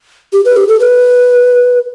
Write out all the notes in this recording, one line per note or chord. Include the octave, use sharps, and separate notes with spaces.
G4
B4
G4
A4
B4